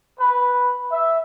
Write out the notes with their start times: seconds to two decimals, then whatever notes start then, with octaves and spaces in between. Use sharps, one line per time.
0.19 B4
0.92 E5